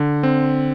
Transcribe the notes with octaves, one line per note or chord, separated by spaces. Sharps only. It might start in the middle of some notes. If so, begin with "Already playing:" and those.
Already playing: D3
C4